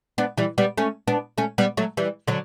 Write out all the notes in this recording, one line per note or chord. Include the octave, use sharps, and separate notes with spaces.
B3 D4
E3 G3
G3 B3
A3 C#4
B3 D4
A3 C#4
G3 B3
F#3 A3
E3 G3
D3 F#3